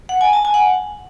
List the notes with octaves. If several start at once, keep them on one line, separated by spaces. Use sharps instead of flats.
F#5
G#5
A5
G#5
F#5